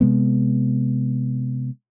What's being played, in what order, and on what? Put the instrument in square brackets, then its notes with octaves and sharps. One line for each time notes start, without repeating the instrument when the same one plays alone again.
[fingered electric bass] C3 G#3 B3